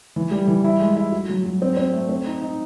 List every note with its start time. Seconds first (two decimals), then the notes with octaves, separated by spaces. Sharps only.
0.16 E3
0.31 G3
0.48 E3
0.64 E4
0.80 G#3
0.97 E4
1.12 F#4
1.29 F#3
1.46 F#3
1.62 C4
1.77 C4
1.94 A3
2.09 C4
2.26 D#4
2.42 D#4